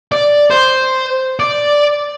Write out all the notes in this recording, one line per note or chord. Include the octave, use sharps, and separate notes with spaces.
D5
C5
D5